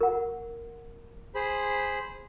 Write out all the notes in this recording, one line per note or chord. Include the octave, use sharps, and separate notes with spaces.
A#4 F#5
G#4 C5 B5